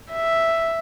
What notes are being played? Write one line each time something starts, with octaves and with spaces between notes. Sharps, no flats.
E5